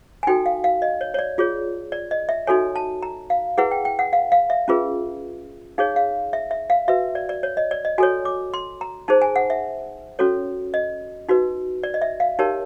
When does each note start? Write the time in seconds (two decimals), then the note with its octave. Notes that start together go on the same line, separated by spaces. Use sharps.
0.23 G#5
0.27 D#4 F#4 A4 G5
0.46 F5
0.64 F5
0.82 D#5
1.01 C#5
1.14 C#5
1.19 D5
1.38 F4 G#4 C#5
1.92 D5
2.11 D#5
2.29 E5
2.47 D#4 F#4 A4 C#5 G#5
2.76 A5
3.03 A#5
3.30 F5
3.58 E4 G#4 B4 F#5
3.71 G5
3.85 G5
3.99 F#5
4.13 F5
4.32 F5
4.50 E5
4.68 C#4 F4 G#4 B4
5.78 D#4 G#4 C#5 F5
5.96 F5
6.33 E5
6.51 E5
6.70 F5
6.88 F#4 B4 E5
7.15 D5
7.29 D5
7.43 C#5
7.57 D#5
7.71 D5
7.85 D#5
7.98 F#4 A4 C#5 G#5
8.25 D6
8.54 C6
8.81 A#5
9.08 D#4 G#4 C5 A5
9.22 G#5
9.36 F#5
9.50 E5
10.19 C#4 F#4 A4 C#5
10.74 D#5
11.29 D#4 F#4 B4
11.83 D5
11.94 D#5
12.02 E5
12.20 F5
12.39 D#4 G4 A#4 C#5 A5